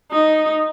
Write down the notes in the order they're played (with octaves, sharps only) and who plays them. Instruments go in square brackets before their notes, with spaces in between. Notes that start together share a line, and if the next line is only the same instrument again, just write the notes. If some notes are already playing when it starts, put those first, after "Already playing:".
[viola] D#4